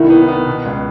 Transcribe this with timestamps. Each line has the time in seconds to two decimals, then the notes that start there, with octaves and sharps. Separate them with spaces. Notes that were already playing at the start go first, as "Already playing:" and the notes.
Already playing: C2 D#3 E4
0.10 B3
0.28 B3
0.46 B2
0.65 C#2